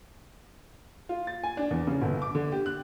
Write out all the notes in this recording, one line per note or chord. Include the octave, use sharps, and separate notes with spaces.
F4
A6
G#5
D4
E2
C#3
G1
D6
D3
G4
F#6